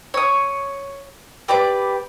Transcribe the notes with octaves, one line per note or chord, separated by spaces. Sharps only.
C#5 D#6
G4 B4 D5 D6